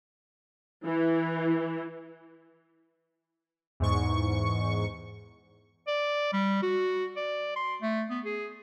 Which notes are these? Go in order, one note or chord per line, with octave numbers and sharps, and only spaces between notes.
E3
E2 G#2 C#6
D5
G3
F#4
D5
C6
A3
B3
G#4